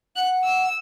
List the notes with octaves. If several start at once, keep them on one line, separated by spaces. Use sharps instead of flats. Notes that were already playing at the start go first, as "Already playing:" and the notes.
F#5 F#6
E6